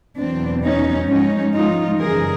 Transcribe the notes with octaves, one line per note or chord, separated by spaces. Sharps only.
E2 B2 F#3 C4 D4
C#4 D#4
G#2 F3 G#3 C#4 D#4
D#4 F4
F#2 C#3 E3 G3 G#4 A#4